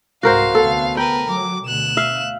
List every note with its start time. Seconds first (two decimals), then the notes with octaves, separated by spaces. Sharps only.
0.23 C2 G#2 F#4 A#4 C5 F5
0.55 D2 B3 A4
0.97 A#4 B4 G5
1.30 F#3 D6
1.66 D2 B2 F#6 E7
1.97 E5 F5